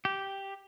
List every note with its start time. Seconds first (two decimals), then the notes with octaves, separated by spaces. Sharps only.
0.05 G4